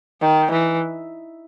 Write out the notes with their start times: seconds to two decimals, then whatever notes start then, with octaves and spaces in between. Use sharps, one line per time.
0.22 D#3
0.51 E3